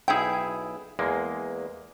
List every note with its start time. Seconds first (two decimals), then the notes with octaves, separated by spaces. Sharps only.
0.08 B1 D#4 E4 G#4 G5
0.99 E2 G#3 A#3